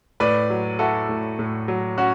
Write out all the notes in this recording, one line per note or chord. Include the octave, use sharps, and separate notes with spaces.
A2 B4 D5
F#3
E4 F#4 A4
A2
A2
F#3
C#4 F#4